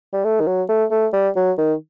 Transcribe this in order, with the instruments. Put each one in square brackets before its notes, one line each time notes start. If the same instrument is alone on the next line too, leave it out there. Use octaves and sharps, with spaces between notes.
[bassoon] G3
A3
D#3
F#3
A3
A3
G3
F#3
D#3